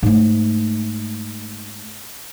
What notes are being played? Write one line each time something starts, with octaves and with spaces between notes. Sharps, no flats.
G#2 A3